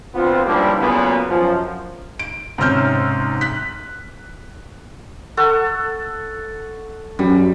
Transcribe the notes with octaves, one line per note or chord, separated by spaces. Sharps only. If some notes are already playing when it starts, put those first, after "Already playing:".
D2 B3 C4 F4
C#2 F3 G3 A#3 D4 E4
A#2 C#3 F#3 A#3 B3
F#2 F3
D7
G#2 C3 C#4 E6 F6 G6
F#6 B6
A4 F#5 C#6
F#2 G3